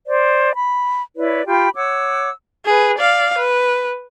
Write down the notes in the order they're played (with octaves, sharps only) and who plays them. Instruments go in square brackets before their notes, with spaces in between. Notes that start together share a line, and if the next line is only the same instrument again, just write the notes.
[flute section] C5 D5
B5
E4 B4 C#5 D5
F4 G4 G5 B5
C#5 F#5 D6 E6
[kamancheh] G#4 B4
D5 F5
B4